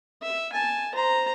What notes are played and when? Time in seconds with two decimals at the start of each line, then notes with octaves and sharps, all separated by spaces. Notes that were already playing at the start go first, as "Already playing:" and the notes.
0.22 E5
0.53 G#5 A5
0.95 C5 A#5